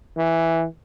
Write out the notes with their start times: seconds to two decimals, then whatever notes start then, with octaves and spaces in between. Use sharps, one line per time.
0.17 E3